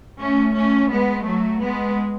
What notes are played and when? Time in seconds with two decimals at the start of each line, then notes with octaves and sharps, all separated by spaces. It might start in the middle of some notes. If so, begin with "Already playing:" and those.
0.20 A3 C#4
0.54 A3 C#4
0.91 G#3 B3
1.26 F#3 A3
1.61 G#3 B3